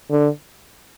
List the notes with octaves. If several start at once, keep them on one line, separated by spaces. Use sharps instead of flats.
D3